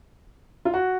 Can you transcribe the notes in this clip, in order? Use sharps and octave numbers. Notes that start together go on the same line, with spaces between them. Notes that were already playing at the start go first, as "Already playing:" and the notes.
F4
F#4